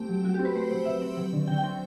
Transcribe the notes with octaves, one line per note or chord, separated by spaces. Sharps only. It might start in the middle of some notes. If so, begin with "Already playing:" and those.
Already playing: A3 C4 G4
F#3
F#3 F#4
C4 G4
B4
A3 C5
F#3
F#3 E5
C4
F#3
D3
D3 G5
G5
C4